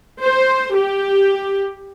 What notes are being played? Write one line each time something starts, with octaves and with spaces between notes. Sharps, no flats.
C5
G4